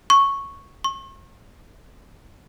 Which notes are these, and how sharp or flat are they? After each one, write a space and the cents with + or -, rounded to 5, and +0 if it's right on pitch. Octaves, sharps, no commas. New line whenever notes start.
C#6 -5
C#6 -40